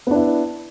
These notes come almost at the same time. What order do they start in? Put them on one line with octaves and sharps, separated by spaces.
B3 D4 E4